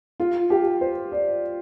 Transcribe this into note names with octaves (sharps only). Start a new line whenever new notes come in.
F4
G4
C5
D5